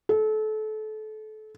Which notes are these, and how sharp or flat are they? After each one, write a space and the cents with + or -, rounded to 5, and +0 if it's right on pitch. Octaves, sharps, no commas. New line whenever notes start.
A4 -30